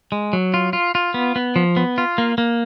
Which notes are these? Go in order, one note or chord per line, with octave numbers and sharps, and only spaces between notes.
G#3
F#3
F4
F4
F4
B3
B3
F3
B3
F4
A#3
A#3